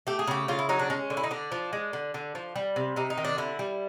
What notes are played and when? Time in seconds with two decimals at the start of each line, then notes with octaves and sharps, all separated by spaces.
0.07 A3 G4
0.19 G#4
0.27 C#3 G4
0.48 C#3 F4
0.59 E4
0.69 F#3 D#4
0.79 D4
0.90 G#3 C#4
1.10 D3
1.17 E4
1.23 D#4
1.31 D3 D4
1.52 F3
1.73 G#3
1.93 D3
2.14 D3
2.35 F3
2.56 G3
2.76 C3
2.96 C3 D#4
3.10 D#4
3.18 D#3
3.25 D4
3.38 D3 E4
3.59 G3